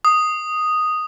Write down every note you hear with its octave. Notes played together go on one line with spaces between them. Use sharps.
D#6